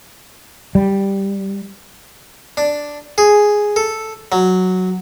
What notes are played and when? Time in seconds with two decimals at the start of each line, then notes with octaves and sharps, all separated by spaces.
0.75 G3
2.57 D4
3.18 G#4
3.76 A4
4.32 F#3